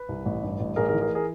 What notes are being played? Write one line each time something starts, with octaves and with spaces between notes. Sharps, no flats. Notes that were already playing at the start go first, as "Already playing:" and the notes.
Already playing: B4
C2
A1
G2
A1
A1 G#4 A#4
G#4 A#4
E3
G#4 A#4
G#4 A#4